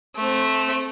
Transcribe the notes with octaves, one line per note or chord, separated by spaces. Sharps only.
A3 C4